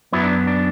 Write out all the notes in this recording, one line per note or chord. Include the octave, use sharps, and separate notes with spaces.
F#2 F#3 B3 E4
D4
D4